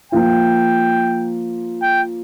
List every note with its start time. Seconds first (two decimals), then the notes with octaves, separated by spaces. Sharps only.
0.12 F3 A#3 F4 G5
1.82 G5